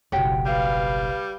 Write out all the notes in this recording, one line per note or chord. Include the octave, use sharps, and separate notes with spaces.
F#1 B1 F#4 G4 C#5
G3 B4 F5